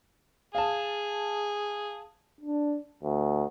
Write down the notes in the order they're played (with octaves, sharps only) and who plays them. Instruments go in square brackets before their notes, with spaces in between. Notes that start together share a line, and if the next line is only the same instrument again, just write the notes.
[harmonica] G#4 [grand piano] F5 A5
[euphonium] D4
D2